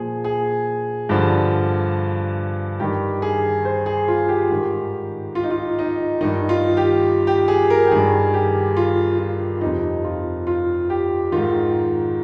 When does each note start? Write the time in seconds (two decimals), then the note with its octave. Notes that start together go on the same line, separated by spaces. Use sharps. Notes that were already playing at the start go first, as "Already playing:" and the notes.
Already playing: A#2 F3 G#4
0.24 G#4
1.09 G2 D3 F3
2.80 G2 D#3 G4
3.22 G#4
3.65 C5
3.86 G#4
4.08 F4
4.28 G4
4.50 G#2 D#3
5.35 F4
5.43 D#4
5.51 F4
5.79 D#4
6.21 G2 D#3 D#4
6.49 F4
6.77 G4
7.27 G4
7.48 G#4
7.70 A#4
7.87 G4
7.91 G2 D#3 G#4
8.34 G4
8.77 F4
9.19 F4
9.61 F2 C3 F3 D#4
10.04 F4
10.47 F4
10.90 G4
11.32 G#2 D#3 F4